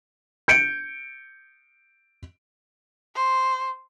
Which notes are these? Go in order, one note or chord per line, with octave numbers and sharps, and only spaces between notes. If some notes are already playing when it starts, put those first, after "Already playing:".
G6 C#7 D7
C5